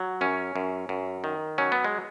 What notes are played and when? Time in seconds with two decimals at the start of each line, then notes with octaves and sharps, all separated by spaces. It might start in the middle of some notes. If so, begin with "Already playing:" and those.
Already playing: F#3
0.21 F#2 C#4
0.56 F#2
0.89 F#2
1.24 D#3
1.58 F#3 C#4
1.72 B3
1.84 G#3